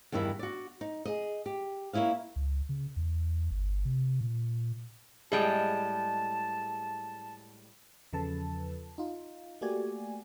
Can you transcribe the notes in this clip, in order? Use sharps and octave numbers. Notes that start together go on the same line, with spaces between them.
E2 G2 D#3 E4 E5
F#4 D5
D#4
G#4 D#5
G4
A#3 C#4 E4 D#5 F5
C#2
C#3
E2
G1
C3
A#2
A2 G3 G#3 G#4 D#5 A5 D7
E2 C#3 F3 A4 B4 A5
D#4 F4
A3 A#3 F#4 G4 D5 G#5